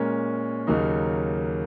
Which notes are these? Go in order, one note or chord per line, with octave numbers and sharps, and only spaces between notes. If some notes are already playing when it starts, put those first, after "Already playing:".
Already playing: A#2 G#3 C#4 A#4
D#2 C#3 F#3 A#3 D#4